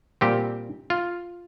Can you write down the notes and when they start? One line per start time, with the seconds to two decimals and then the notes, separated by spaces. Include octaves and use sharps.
0.21 A#2 G3 C4 G4
0.90 F4